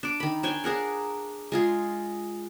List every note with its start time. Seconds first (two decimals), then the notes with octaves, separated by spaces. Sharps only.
0.03 D4 D6
0.20 D#3 B5
0.43 D4 C#5 G5 G#5
0.64 D4 G#4 A#4 F#5
1.52 G#3 F4 G#4